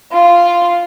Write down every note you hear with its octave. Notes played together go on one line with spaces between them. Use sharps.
F4